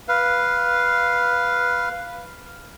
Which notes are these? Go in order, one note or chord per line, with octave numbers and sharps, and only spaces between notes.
B4 F5